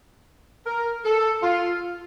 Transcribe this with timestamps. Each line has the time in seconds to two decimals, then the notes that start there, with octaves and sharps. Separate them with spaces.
0.66 A#4
1.05 A4
1.43 F4